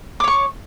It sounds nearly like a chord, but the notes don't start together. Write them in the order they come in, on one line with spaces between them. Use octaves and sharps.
D6 C#5 C#6